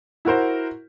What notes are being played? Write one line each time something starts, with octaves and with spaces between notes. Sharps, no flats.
E4 F#4 A#4 C5